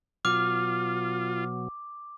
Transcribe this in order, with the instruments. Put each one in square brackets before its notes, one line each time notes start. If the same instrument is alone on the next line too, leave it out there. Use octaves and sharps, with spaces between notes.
[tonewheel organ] B2 F#3 [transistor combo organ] F4 [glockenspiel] D6 [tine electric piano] F6